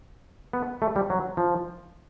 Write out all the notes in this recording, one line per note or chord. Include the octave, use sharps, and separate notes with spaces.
B3
A3
G3
F#3
F3